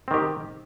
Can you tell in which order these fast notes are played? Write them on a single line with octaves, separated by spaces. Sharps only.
C4 D#3 G4